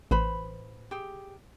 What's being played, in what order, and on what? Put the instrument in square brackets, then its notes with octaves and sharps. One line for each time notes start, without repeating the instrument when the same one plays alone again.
[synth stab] A1 [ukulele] B4 C5 B5
[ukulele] G4 G#4